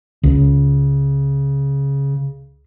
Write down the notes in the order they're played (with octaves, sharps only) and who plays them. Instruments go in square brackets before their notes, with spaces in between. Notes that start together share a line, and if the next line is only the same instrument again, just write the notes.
[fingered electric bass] C#2 [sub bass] C#3